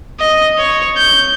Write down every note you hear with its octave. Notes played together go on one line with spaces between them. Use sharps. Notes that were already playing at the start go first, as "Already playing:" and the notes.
D#5
C#5
G6